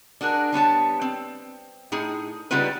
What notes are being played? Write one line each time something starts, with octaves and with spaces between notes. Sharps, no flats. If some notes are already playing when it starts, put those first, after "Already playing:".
D4 F#4 G#4 A#4
G3 B3 C#5 A5
C4
A2 D#4 G#4
C#3 G3 B3 D#4 F4 B4